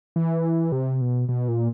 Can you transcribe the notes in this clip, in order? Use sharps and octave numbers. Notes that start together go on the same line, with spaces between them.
E3
C3
B2
B2
A#2